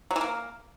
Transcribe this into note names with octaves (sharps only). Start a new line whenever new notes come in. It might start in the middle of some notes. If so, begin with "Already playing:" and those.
F#3
E3
A#3